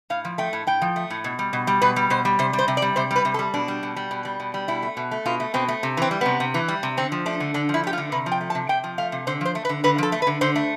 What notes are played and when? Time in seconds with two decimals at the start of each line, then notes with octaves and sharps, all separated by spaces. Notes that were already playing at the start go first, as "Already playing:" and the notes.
0.10 A2 F5
0.25 F3
0.38 A3 G5
0.53 A2
0.67 A2 G5
0.82 F3
0.96 A3
1.10 A2
1.24 B2
1.39 G3
1.53 B2
1.67 G3
1.82 B2 B4
1.96 G3
2.10 B2 C5
2.25 G3
2.39 C3 C5
2.53 G3
2.58 C5
2.68 C3
2.77 D5
2.82 G3
2.96 C3 C5
3.11 G3
3.16 B4
3.25 C3
3.34 A4
3.39 G3
3.54 B2 D4
3.68 G3
3.83 B2
3.96 G3
4.11 B2
4.25 G3
4.40 B2
4.54 G3
4.68 B2 E4
4.83 A3
4.97 B2
5.11 A3
5.26 B2 F4
5.40 A3
5.54 B2 C4
5.68 A3
5.83 C3
5.97 E3 C4
6.11 G3
6.21 C3 B3
6.40 C3
6.54 E3
6.68 G3
6.83 C3
6.97 D3 C4
7.12 F3
7.26 A3 D4
7.40 D3
7.54 D3 D4
7.69 F3 E4
7.83 A3 G4
7.93 F4
7.98 D3
8.12 C3 B4
8.26 F3
8.32 G5
8.41 A3
8.50 A5
8.55 C3
8.69 C3 G5
8.84 F3
8.98 A3 F5
9.12 C3
9.27 D3 C5
9.41 F3 C5
9.55 A3
9.65 B4
9.69 D3
9.84 D3 B4
9.98 F3 A4
10.12 A3
10.22 B4
10.27 D3
10.41 D3 C5
10.55 A3